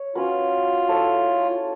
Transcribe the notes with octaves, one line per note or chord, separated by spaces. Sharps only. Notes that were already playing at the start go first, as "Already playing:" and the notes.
Already playing: C#5
C#4 F4 F#4 B4
E4 A4 C#5 E5